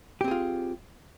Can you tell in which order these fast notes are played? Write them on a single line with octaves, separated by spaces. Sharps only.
G4 C4 G#4 F4